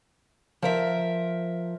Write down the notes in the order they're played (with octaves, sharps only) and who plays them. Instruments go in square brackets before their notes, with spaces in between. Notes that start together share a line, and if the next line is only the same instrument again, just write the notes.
[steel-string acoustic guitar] F3 A#4 E5